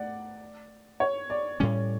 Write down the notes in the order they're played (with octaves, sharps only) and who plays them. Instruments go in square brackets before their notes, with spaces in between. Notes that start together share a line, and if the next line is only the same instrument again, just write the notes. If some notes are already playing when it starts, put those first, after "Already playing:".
Already playing: [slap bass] A3 [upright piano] D5 F#5
[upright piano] C#5
D5
[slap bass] A2 G3 C#4